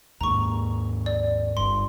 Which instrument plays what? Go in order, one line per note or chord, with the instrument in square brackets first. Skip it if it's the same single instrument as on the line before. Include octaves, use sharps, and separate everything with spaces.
[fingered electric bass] D#2 G#2 A#3 [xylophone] A#5 C#6
[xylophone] D5
[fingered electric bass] G1 G2 [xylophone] C6